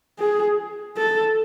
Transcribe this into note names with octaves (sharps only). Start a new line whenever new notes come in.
G#4
A4